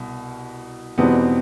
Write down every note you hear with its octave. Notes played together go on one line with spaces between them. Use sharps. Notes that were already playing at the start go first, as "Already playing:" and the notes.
Already playing: C2 B2
E2 B2 G3 B3 C4 D#4